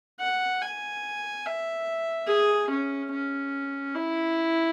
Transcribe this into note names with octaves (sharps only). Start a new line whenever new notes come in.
F#5
G#5
E5
G#4
C#4
C#4
E4